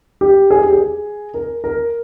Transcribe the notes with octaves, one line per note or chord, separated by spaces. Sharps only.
G4
G#4
G4
G#4
A#4
A#4